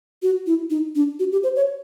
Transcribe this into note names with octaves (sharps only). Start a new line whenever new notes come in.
F#4
E4
D#4
D4
F#4
G4
C5
C#5